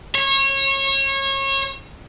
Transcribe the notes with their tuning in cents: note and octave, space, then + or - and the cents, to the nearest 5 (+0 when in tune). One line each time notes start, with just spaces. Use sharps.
C#5 -25